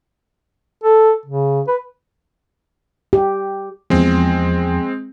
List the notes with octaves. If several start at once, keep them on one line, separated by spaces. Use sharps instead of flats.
A4
C#3
B4
G4
E2 F3 G#3 C4